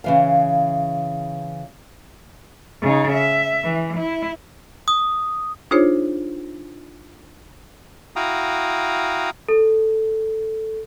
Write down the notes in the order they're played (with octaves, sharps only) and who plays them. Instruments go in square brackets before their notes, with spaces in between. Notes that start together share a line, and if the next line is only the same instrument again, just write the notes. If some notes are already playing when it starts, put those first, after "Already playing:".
[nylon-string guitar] C#3 E3 F5
[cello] C#3 D#4
E5
E3
E4
[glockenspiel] D#6
[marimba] D4 D#4 F4 G#4 C5 C#5
[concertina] E4 F#4 F5 G5 A#5 D#6
[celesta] A4